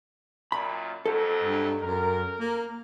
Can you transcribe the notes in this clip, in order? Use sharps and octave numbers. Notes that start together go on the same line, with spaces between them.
F#2 A#2 B5
F2 F#3 D#4 A4
G2
F#2 A#4
A#3